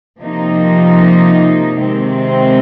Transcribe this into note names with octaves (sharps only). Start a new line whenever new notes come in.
C3 F3 A#3 D#4
C3 D#3 G#3 C4